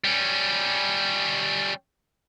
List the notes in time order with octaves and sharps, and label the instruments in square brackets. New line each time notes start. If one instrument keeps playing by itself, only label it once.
[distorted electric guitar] G3 C#4